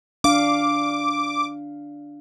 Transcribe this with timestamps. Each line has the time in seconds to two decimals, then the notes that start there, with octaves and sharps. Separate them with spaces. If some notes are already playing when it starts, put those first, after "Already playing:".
0.24 D4 F5 D6